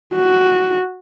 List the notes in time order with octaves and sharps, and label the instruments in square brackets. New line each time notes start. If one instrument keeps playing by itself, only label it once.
[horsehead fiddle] F#4